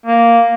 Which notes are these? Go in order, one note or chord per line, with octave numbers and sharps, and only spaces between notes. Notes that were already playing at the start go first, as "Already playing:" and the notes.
A#3